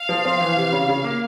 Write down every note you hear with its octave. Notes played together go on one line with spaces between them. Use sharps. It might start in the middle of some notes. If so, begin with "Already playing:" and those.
Already playing: F5
F3
C4
E3
C3
C#3
C#3
A#3